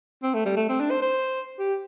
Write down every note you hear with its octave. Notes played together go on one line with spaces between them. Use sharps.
C4
A3
G3
A3
C4
D4
C5
C5
G4